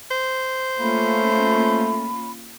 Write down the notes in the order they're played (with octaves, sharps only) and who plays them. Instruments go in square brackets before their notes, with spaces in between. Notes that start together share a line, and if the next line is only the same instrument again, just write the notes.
[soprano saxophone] C5
[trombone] A3 [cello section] A#3 C#4 F4 [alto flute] B5